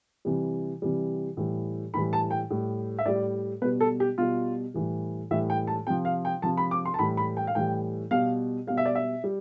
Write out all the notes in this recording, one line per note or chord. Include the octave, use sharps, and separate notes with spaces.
C3 E3 G3
C3 E3 G3
A2 E3 G3
A2 E3 G3 B5
A5
G5
A2 G3
E5
A2 G3 D5
B2 G3 B4
A4
G4
B2 G3 F4
A2 E3 G3
A2 E3 G3 E5
G5
A5
C3 F3 G5
F5
G5
C3 F3 A5
B5
D6
C6
A5
A2 E3 G3 B5
B5
G5
F5
A2 E3 G3 G5
B2 G3 F5
B2 G3 F5
E5
D5
E5
G3